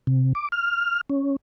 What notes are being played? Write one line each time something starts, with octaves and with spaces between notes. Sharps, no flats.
C3
D6
F6
C#4